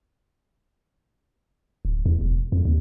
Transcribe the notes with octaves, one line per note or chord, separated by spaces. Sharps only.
D1
E2
E1
F2
D#2